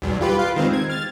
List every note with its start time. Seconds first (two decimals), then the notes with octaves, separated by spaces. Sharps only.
0.02 B1 E2 G2
0.21 F4 G4 B4
0.39 F4 F5
0.56 D#3 G#3 C4
0.73 G#6
0.90 F6 A6